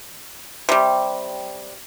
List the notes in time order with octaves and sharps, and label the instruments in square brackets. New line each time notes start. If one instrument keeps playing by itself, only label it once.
[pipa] C3 G3